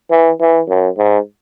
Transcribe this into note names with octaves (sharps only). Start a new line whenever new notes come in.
E3
E3
F#2
G#2